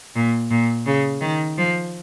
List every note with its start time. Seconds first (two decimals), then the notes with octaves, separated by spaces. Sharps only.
0.16 A#2
0.50 A#2
0.87 C#3
1.21 D#3
1.58 F3